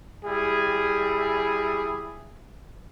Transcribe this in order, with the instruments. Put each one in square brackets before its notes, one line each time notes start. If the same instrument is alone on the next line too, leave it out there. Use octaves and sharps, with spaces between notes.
[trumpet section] G3 E4 G#4